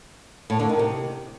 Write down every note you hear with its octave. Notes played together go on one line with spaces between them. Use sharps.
A2
D3
D#3
C3